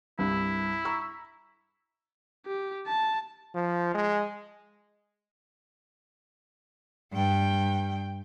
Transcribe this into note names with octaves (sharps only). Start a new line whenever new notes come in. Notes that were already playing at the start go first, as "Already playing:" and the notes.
C2 G2 E4
A#5 C#6 E6
G4
A5
F3
G#3
G2 G5